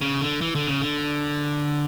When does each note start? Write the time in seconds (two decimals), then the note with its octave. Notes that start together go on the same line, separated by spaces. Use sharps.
0.01 C#3
0.21 D3
0.41 E3
0.55 D3
0.67 C#3
0.82 D3